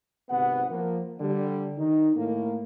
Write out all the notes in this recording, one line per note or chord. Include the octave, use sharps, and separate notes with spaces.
G#1 C3 B3 F#5
F3 A#3
D3 G3
D#3 D#4
A2 A#3